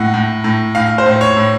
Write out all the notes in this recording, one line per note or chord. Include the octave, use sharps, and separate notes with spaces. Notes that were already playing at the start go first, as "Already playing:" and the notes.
Already playing: A2 F#5
A2
A2
A2 F5
C5
A2
C#5
A2